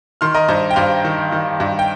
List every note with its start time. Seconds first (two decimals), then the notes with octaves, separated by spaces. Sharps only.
0.21 D#3 C6 F6
0.34 A#4 D#5
0.48 G2 C5
0.70 G5
0.76 G2 C5 F5
1.04 D#3
1.32 D#3
1.60 G2
1.79 G5